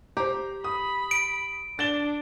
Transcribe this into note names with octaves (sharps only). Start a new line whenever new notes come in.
G4 C5 A#5
B5 D#6
D7
D4 A6 E7 G7